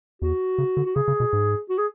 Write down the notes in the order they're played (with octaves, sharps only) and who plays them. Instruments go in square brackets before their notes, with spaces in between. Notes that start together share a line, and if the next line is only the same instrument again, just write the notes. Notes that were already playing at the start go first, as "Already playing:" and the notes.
[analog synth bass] E2 [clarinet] F#4
[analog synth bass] C#3
D3
[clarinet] F#4
[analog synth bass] C#3 [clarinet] G#4
[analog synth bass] C#3
B2
G#2
[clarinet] F#4
G#4